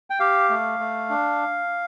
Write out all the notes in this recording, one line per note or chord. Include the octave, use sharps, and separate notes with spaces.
G5
G4 F5
A3
A3
D4